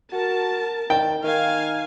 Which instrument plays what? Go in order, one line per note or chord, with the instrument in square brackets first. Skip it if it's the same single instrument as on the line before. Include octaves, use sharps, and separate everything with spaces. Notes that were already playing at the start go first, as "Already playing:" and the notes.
[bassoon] F#4 [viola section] A#4 A5
[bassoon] D#3 [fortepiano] G5
[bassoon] D#3 [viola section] F5 G#5